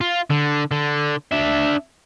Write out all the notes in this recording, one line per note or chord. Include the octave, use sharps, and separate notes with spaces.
F4
D3
D3
D4 E5